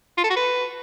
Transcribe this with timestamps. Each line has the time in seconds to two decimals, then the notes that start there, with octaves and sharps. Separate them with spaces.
0.18 F4
0.24 A4
0.30 F#4
0.36 B4